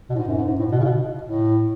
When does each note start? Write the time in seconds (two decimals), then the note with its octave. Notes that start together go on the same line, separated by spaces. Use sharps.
0.10 B2
0.15 A2
0.18 G#2
0.28 F#2
0.37 G#2
0.48 G#2
0.59 A2
0.72 B2
0.80 C#3
0.84 B2
1.22 A2